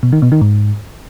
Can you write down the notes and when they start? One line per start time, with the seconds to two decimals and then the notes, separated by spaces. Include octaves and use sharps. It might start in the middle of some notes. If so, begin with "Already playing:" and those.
0.03 B2
0.12 D#3
0.22 B2
0.32 D#3
0.41 G#2